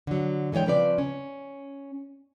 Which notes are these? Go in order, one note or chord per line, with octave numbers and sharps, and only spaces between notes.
D3 F#3
D3 E3 G#3 C#5 G5
C#3 F3 C4 B4 C#5 D5
C#4